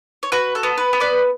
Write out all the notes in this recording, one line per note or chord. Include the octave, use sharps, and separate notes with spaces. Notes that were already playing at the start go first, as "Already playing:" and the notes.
C#5
F#4 B4
A4
B3
B4
B3
B4 D5